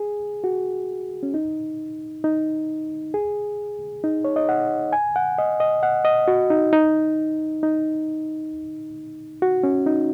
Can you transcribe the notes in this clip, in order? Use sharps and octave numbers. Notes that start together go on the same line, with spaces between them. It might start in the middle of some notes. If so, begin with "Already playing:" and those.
Already playing: G#4
F#4
C#4
D#4
D#4
G#4
D#4
C#5
D#5
F#5
G#5
F#5
D#5
D#5
F#5
D#5
F#4
D#4
D#4
D#4
F#4
C#4
D#4